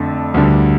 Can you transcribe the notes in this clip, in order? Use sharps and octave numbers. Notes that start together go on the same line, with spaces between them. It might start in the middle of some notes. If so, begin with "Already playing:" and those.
Already playing: F2 D3 A3
D2 D3 G3